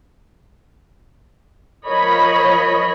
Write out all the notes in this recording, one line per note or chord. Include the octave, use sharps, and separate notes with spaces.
F3 A#4 C#5 D#5 B5